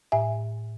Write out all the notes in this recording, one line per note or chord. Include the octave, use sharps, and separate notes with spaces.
A2 E5 G#5